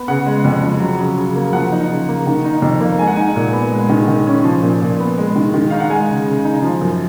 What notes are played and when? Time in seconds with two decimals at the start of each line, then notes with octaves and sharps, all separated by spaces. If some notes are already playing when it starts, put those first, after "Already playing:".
Already playing: B3
0.08 C#3 F#5
0.26 G#3
0.45 F2
0.62 F3
0.80 F#3
0.99 C#3
1.18 C#3
1.35 A#3
1.53 F3 F#5
1.72 D#4
1.89 C#3
2.09 A#3
2.26 D#3
2.45 D#4
2.62 F2
2.81 A#3
2.98 G#3 G#5
3.07 F#5
3.16 D#4 G#5
3.36 A#2
3.53 B3
3.72 G#3
3.89 D#3
4.08 D#3
4.27 C#4
4.44 F3
4.62 A#2
4.82 A#2
5.00 B3
5.18 G#3
5.36 D#3
5.54 D#3
5.71 D#4 F5
5.80 F#5
5.90 G#3 G#5
6.09 C#3
6.26 C#3
6.45 D#4
6.63 F3
6.81 F#2